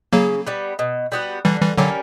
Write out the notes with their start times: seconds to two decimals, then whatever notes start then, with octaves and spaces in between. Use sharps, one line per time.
0.13 C#3 F#3 A#3
0.47 G3 B3
0.79 B2
1.12 G3 B3 F#4
1.45 D3 E3 G3
1.61 E3 G3
1.77 D3 F#3 G3 A#3 C#4